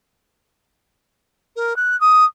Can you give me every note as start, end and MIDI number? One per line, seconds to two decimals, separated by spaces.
1.56 1.76 70
1.76 1.99 90
2.01 2.24 87